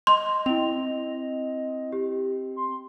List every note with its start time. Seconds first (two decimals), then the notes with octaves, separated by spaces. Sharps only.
0.07 D#5 C6
0.46 C4 E4 F7
1.92 G4
2.56 C6